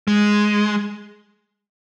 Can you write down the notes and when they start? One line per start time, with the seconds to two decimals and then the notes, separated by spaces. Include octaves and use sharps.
0.08 G#3